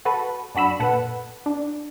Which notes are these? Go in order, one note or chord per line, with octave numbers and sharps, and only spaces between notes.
F#4 A4 B4
F#2 D4 F#4 B5 E6
A#2 A4 B4 F#5
D4